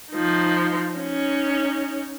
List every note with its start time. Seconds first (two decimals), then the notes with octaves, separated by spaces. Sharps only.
0.11 F3 D#4
0.96 C#4 D#4